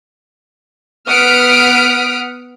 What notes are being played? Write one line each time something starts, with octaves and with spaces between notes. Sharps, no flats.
B3 F#5 D#6 F6 B6 D7